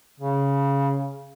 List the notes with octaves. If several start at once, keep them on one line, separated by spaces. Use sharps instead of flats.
C#3